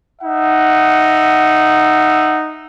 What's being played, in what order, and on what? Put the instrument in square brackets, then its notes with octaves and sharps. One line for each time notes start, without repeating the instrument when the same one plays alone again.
[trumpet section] D#4 E5 F#5